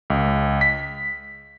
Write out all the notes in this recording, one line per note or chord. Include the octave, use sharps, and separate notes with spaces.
C#2
B6